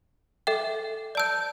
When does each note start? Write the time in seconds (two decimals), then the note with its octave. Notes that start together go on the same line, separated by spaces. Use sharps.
0.47 A4 E5 G5
1.15 D5 A5 E6 G6